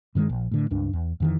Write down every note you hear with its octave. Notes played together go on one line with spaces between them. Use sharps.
G2 D#3 G3 G#3
A#1
A2 D3
C#2 G2 D4
E2
F2 D#3 E3